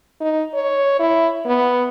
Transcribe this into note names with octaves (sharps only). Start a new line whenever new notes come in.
D#4
C#5
E4
B3